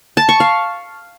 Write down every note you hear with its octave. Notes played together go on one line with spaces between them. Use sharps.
A5
C#6
F5